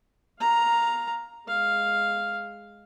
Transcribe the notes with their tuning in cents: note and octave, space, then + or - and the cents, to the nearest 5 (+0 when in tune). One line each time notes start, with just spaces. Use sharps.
F5 +15 A#5 +0
G#3 +0 F5 +0